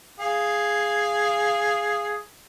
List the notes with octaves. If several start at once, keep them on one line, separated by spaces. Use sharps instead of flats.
G#4 F5